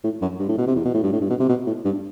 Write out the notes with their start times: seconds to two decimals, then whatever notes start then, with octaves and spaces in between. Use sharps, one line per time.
0.04 A2
0.21 F#2
0.39 G2
0.49 A2
0.58 B2
0.67 C3
0.76 E2
0.85 B2
0.94 A2
1.03 G2
1.12 A2
1.21 G2
1.30 B2
1.40 C3
1.49 B2
1.67 A2
1.85 G2